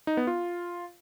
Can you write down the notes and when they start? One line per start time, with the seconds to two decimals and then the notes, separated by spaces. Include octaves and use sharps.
0.07 D#4
0.17 B3
0.27 F4